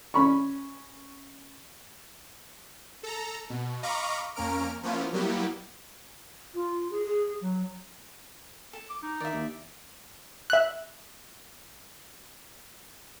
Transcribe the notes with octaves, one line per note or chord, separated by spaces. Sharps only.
C#4 B5 C#6
A4 A#5
B2
D#5 F5 A#5 B5 C#6 D6
F2 A#3 C#4 A#4 F6 D7
F3 A#3 B3 C#4 E4 F4
F#3 G3 A#3 B3 E4 G4
F4
G#4
G#4
F#3
A4
D6
D#4
D#3 D5 E5
D#2
E5 F#6